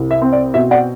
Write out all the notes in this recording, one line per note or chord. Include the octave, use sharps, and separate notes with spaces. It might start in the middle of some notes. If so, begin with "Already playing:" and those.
Already playing: C2
E5
C4
D5
B2 E5
D5 F#5